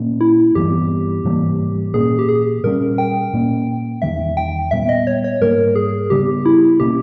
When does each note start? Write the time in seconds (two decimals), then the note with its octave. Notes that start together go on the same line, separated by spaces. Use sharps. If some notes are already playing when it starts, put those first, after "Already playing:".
Already playing: A#2 A#3 C#4
0.21 E4
0.55 G2 E3 G3 B3 G4
1.24 G#2 E3 G3 A#3
1.94 A#2 A#3 C#4 G#4
2.19 G4
2.29 G#4
2.63 A#2 G3 C#4 A#4
2.98 G5
3.33 A#2 A#3 C#4
4.02 E2 D#3 G3 E5
4.37 G5
4.71 A#2 G3 B3 E5
4.89 D#5
5.07 C#5
5.24 C#5
5.41 G#2 G3 A#3 A#4
5.75 G#4
6.10 C#3 G3 B3 G4
6.46 E4
6.80 B2 A#3 C#4 G4